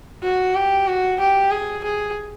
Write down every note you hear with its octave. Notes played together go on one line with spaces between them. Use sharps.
F#4
G4
F#4
G4
G#4
G#4